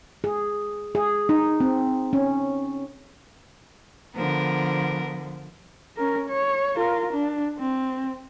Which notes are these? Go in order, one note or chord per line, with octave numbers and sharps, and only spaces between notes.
G#4
G#4
D#4
C4
C#4
D3 F3 B3 A#4
C#4 A#4
C#5
F4 A#4
D4
C4